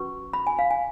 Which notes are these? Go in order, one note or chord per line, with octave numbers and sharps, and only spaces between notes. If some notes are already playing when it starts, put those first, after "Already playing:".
Already playing: C#4 F#4 B4 C#6
B5
G#5
F5
G#5